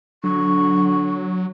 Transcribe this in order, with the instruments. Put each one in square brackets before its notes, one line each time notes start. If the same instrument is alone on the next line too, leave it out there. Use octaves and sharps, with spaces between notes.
[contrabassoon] D3 [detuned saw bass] F#3 [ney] C#6